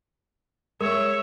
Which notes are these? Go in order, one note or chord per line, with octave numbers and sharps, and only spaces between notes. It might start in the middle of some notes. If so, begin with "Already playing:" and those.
G#3 A#4 C#5 E5